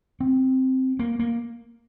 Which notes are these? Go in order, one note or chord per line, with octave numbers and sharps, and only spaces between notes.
C4
A#3
A#3